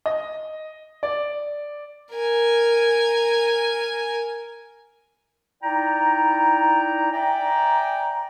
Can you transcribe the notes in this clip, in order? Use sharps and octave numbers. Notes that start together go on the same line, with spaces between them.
D#5
D5
A#4 G#5
D#4 E4 D5 G5 A#5
D5 E5 G5 G#5 A#5